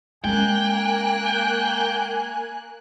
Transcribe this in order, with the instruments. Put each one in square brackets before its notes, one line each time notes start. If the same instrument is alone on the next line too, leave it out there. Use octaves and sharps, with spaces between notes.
[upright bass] G#3 C#4 [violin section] A#3 F#6 [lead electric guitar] G5 [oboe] G#5